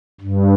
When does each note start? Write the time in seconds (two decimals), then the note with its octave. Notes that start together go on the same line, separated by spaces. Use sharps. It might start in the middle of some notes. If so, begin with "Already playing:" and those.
0.21 G2